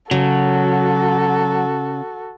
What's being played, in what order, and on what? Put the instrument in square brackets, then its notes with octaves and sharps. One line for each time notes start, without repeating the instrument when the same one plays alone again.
[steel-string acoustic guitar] C#3 [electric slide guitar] F#3 [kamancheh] F#4 A4